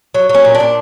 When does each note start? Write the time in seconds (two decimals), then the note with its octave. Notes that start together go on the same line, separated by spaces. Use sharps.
0.14 F#3
0.29 F#3
0.34 C#4
0.45 A#2
0.55 D4
0.60 A#2